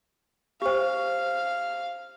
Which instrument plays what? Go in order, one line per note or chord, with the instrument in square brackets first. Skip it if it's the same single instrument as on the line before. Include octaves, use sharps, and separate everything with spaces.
[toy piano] G4 C5 [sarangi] F5